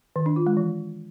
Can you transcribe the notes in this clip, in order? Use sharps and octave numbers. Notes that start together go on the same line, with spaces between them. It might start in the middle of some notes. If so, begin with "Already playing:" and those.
D#3
D4
F4
G#3
E3